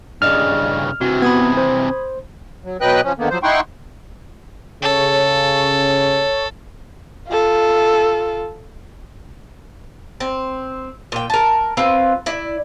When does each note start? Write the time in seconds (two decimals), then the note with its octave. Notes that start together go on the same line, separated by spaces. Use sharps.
0.22 G2 C#3 D5 D#5 F6
1.01 C3 E3 F#4
1.22 B3 B5 D#6 G#6
1.57 C5
2.64 F#3
2.81 B2 F#3 B4 D#5 G5 F#6
3.03 F3 C#4
3.18 D3 D#3 A#3 B3
3.30 F3 F#3 C5
3.43 D#4 E4 F#5 G5 C6 C#6
4.82 C#3 A4 C#5
7.28 F4 A4
10.20 C4
11.12 A#2 G5
11.30 A#4 A5
11.77 C4 F4 B4
12.26 E4 D5